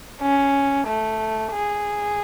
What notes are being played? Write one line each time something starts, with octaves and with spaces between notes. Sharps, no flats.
C#4
A3
G#4